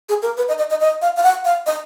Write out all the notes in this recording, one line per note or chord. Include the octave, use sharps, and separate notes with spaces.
G#4
A#4
B4
D#5
D#5
D#5
D#5
F5
F5
F#5
F5
D#5